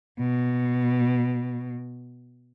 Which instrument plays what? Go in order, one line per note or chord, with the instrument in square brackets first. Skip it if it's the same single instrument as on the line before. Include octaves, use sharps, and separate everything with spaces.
[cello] B2